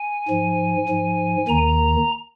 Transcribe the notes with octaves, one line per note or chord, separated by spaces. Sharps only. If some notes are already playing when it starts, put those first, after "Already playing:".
Already playing: G#5
G#2 F3
G#2 F3
D#2 D#3 A#5